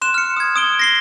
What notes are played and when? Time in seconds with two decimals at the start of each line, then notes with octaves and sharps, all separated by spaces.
0.02 C6 F#6 E7
0.14 F6 C#7
0.37 D#6 G#6
0.56 D#6 D7 G7
0.79 A#6 C7 G7